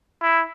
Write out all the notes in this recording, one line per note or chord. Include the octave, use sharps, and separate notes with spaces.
E4